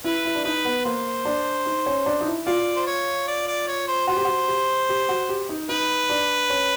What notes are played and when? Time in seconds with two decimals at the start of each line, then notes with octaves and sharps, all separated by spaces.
0.04 E4 B4
0.25 E4
0.35 D4
0.44 D#4 B4
0.65 B3
0.85 A#3 C5
1.25 D4
1.66 D#4
1.86 C#4
2.06 D4
2.21 D#4
2.27 E4
2.47 F4 D5
2.76 C5
2.87 C#5
3.27 D5
3.47 D5
3.67 C#5
3.88 C5
4.07 F#4 C5
4.17 G4
4.25 F#4
4.48 G4
4.89 G4
5.09 F#4
5.29 G4
5.49 D#4
5.69 D#4 B4
6.10 D4
6.50 C#4